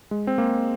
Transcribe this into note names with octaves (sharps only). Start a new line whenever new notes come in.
G#3
C4
A#3